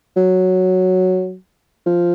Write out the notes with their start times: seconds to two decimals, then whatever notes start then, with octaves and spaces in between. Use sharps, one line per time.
0.16 F#3
1.86 F3